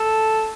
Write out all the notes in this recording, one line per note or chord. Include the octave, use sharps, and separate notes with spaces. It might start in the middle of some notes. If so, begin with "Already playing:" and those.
Already playing: A4